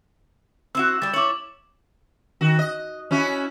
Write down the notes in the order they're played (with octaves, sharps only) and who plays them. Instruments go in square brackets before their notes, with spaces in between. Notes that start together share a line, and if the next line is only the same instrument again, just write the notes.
[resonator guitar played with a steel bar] C4 E4 F#4 [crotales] E6 E7
[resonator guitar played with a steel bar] G3 D5 [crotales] A6
[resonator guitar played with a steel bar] E4 C#5 [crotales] D6 F#7
[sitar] D#3 F#4
D#5
C#4 E4 F#4